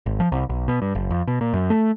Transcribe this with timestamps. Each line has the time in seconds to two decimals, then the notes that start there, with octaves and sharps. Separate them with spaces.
0.06 G#1
0.20 F3
0.32 C2
0.49 B1
0.68 B2
0.82 G2
0.95 F#1
1.10 F2
1.28 B2
1.41 A#2
1.53 F#2
1.70 A3